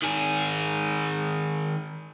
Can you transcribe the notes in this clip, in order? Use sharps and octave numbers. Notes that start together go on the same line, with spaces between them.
D#3 G#4